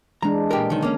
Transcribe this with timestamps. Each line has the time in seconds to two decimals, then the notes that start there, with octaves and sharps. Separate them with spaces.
0.22 E3 G#3 D4 A#5
0.51 A#2 G4 A#4
0.70 B1 D3 D#3
0.83 A#3 C#4